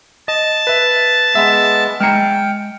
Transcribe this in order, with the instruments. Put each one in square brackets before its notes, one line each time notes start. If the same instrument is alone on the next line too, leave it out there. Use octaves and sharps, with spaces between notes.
[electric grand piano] D#5 [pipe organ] A5
[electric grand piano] B4 E5
[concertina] G#3 B3 [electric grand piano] E5 E7
[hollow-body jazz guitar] G#3 A#5 [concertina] G5 [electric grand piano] F6 C#7